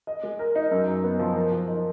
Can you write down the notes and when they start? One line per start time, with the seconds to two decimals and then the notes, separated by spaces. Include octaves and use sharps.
0.07 D#5
0.23 G#3
0.39 A#4
0.56 D#4
0.71 F#2
0.88 F#2
1.04 B3
1.19 F3
1.36 A#4
1.52 F3
1.68 D#4